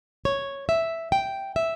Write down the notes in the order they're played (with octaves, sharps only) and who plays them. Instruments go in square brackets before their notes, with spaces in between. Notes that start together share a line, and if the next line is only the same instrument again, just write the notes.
[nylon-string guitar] C#5
E5
G5
E5